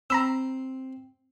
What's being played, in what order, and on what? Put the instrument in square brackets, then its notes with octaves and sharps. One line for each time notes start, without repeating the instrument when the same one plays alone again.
[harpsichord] C4 [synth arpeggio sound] A#5 B5 E6